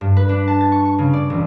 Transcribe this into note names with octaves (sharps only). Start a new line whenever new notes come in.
G2
B4
D4
A5
A6
C#6
C#6
C#3
D5
E1